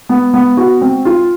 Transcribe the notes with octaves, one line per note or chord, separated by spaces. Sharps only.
B3
B3
F#4
C4
F4